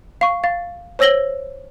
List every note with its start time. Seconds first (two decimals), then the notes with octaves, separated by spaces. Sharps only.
0.21 F5 C#6
0.44 F5 A6
0.99 C5 C#5 E6 A#6 F#7 G7